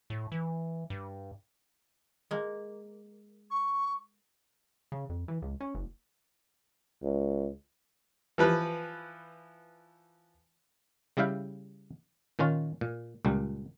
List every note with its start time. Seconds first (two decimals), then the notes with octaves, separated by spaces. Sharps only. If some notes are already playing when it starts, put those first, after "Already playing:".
0.10 A2
0.32 E3
0.90 G2
2.31 G#3 A#3
3.51 C#6
4.92 C#3
5.09 F2
5.28 E3
5.42 C#2
5.61 C#4
5.75 F#1
7.03 C#2
8.38 E3 F3 B4
11.17 C#3 G3 E4 E5 F5 G5
12.39 A#2 D#3 C#4 F4
12.81 A#2
13.25 C#2 A#2 G3